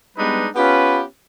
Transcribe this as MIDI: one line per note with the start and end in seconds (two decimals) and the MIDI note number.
0.17 0.47 55
0.17 0.47 56
0.17 0.47 59
0.17 0.47 62
0.17 0.47 63
0.17 0.47 71
0.56 1.02 59
0.56 1.02 61
0.56 1.02 65
0.56 1.02 67
0.56 1.02 71